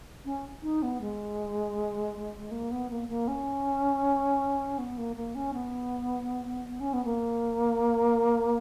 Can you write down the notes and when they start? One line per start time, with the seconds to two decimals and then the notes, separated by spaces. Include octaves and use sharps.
0.25 C#4
0.62 D#4
0.83 B3
1.01 G#3
2.51 A#3
2.71 B3
2.90 A#3
3.09 A#3
3.28 C#4
4.78 B3
4.98 A#3
5.16 A#3
5.35 C#4
5.53 B3
6.80 C#4
6.93 B3
7.05 A#3